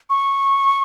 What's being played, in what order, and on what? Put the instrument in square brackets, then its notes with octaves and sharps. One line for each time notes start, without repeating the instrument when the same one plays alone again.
[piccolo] C#6